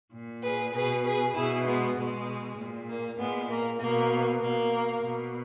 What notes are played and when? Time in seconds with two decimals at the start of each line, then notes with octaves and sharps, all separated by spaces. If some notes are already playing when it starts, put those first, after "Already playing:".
0.12 A#2
0.43 G#4 B4
0.74 B2 G#4 B4
1.04 G#4 B4
1.35 B2 E4 G#4
1.65 G#3 B3
1.96 B2 G#3
2.57 A#2
2.88 A#3
3.18 A#2 G#3 B3
3.49 A#3
3.81 B2 A#3
4.41 B2 A#3
5.02 B2